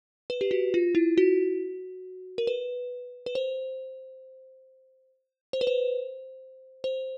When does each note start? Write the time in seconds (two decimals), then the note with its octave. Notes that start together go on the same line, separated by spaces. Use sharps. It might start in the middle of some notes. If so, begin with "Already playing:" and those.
0.30 B4
0.41 G4
0.51 F#4
0.74 F4
0.95 E4
1.18 F#4
2.38 A#4
2.47 B4
3.26 B4
3.35 C5
5.53 C5
5.61 B4
5.67 C5
6.84 C5